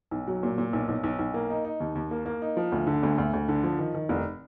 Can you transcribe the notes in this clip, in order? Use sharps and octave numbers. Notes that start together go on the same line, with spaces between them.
B1
F#3
A#2
A#2
B1
B1
B1
B1
A#3
D#4
D#4
D#2
D#2
A#3
A#3
D#4
F3
D2
D3
D2
D2
D2
D3
F3
D#3
D#3
F1